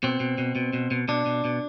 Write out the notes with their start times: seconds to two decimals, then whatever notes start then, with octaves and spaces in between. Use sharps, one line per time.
0.03 B2 C4
0.20 B2
0.38 B2
0.56 B2
0.73 B2
0.91 B2
1.08 B2 D4
1.26 B2
1.45 B2